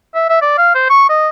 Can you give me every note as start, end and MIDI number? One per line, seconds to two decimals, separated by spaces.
0.15 0.29 76
0.29 0.39 76
0.41 0.55 74
0.58 0.70 77
0.75 0.89 72
0.90 1.06 85
1.09 1.30 75